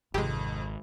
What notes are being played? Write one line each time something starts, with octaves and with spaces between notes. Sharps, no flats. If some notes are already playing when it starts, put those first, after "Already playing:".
G#1 F2 C3 G#3 G4